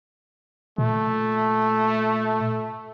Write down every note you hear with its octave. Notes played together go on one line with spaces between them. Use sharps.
A#2 A3